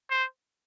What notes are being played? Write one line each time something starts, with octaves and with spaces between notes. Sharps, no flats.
C5